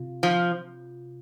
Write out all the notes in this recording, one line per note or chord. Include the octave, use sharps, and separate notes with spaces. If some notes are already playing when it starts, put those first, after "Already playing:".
Already playing: C3 F4
F3